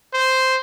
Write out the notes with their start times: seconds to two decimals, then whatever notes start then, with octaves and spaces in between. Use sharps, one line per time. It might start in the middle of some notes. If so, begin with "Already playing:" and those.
0.14 C5